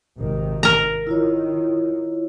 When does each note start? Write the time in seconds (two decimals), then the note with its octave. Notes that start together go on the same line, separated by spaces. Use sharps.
0.18 G#1 C3 D#3
0.63 A#4 A#5
1.07 D#3 E4 F4 C#5